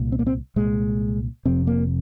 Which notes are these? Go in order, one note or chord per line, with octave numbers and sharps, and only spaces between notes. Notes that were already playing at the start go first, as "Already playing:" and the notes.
Already playing: C2 A#2
C4
A#3
C4
C2 A#2 G#3
F1 F2 C3 C4
A#3